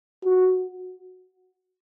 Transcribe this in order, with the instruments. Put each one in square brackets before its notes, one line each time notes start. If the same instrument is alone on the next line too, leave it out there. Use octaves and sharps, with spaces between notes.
[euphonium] F#4